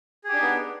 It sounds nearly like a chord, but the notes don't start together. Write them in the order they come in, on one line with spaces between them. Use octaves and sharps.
G#4 G4 D4 D#4 B3